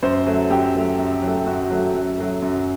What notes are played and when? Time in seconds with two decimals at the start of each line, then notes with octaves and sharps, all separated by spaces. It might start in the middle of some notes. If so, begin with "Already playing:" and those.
0.02 F#2 C5
0.26 F#3 A3
0.50 F#2 G4
0.74 F#3 A3
0.99 F#2
1.22 F#3 A3
1.46 F#2 F#4
1.70 F#3 A3
1.94 F#2
2.18 F#3 A3
2.42 F#2